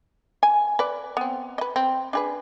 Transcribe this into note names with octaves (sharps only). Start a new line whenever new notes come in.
G#5
B4 D5
B3 C4
B4 D#5
C4
D4 G#4 B4